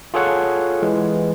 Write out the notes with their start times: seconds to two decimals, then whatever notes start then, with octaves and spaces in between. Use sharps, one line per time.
0.14 F4 G#4 A4 C#5 F#5
0.82 E3 G#3